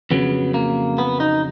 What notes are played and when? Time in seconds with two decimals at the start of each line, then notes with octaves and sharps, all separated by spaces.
0.11 F2 C#3 F#3 B3
0.54 A#3
0.98 B3
1.20 D#4